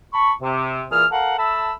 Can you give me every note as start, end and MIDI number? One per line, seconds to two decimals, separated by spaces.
0.14 0.33 81
0.14 0.33 83
0.14 0.33 85
0.42 0.83 48
0.91 1.06 46
0.91 1.06 52
0.91 1.06 68
0.91 1.06 89
1.11 1.37 69
1.11 1.37 70
1.11 1.37 77
1.11 1.37 78
1.38 1.72 69
1.38 1.72 76
1.38 1.72 81
1.38 1.72 83
1.38 1.72 88